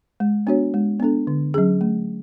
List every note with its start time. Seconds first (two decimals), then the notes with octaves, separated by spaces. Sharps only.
0.20 G#3
0.47 B3 D4 F#4 C#5
0.74 G#3
1.00 B3 D4 A4
1.27 D3
1.54 F#3 C#4 G#4
1.81 A3